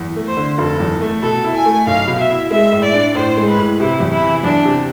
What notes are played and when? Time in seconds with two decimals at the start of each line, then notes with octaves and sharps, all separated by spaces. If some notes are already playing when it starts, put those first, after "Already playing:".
Already playing: E2
0.16 A3
0.27 C5
0.37 D3
0.58 F1 A4
0.80 E2
1.01 A3
1.22 B2 A4
1.44 E4
1.55 G#5
1.65 A3
1.87 B1 F5
2.08 B2
2.19 E5
2.30 E4
2.51 G#3 E5
2.72 A2
2.83 D5
2.94 D4
3.15 A2 C5
3.37 G#3
3.47 B4
3.58 A2
3.79 C3 E4
4.00 E2
4.12 E4
4.22 E3
4.44 E2 D4
4.65 C3